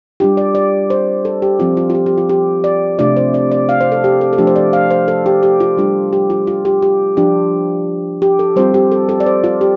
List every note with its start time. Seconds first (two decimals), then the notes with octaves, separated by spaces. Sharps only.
0.20 G3 D4 F4 G4
0.37 D5
0.55 D5
0.90 C5
1.25 A4
1.42 G4
1.60 F3 C4 F4
1.77 F4
1.90 F4
1.95 G4
2.06 G4
2.18 F4
2.29 G4
2.64 D5
2.99 C3 A3 D4 F4 D5
3.17 C5
3.34 D5
3.52 D5
3.69 F5
3.81 C5
3.92 A4
4.04 G4
4.21 A4
4.33 A4
4.38 F3 A3 D4 F4 G4
4.47 C5
4.56 D5
4.73 F5
4.91 C5
5.08 A4
5.26 G4
5.43 G4
5.60 F4
5.77 G3 D4 F4
6.13 G4
6.30 F4
6.47 F4
6.65 G4
6.82 G4
7.17 F3 D4 F4 G4
8.22 G4
8.39 A4
8.56 G3 C4 F4 C5
8.74 G4
8.92 A4
9.09 A4
9.20 D5
9.26 C5
9.44 F4
9.61 G4